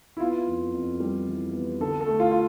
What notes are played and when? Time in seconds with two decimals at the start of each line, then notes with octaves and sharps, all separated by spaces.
0.17 E4
0.20 B3 F4
0.47 F2
0.74 F2
1.00 G3
1.27 E3
1.53 B3
1.81 D3 A4
2.00 A4
2.06 A3
2.20 F4
2.31 F4